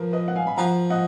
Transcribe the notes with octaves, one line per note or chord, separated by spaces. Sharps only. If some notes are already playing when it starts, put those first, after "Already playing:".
Already playing: F3 A#4 B4
B4 D#5
F#5
F5 G#5
B5
F3 F#5 A#5
D#5 F#5